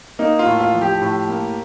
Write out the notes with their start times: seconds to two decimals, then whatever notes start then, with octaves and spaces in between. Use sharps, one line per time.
0.19 A#3 D#4
0.39 F4
0.46 A2
0.60 F4
0.74 F3
0.81 G4
1.02 A2
1.29 A#3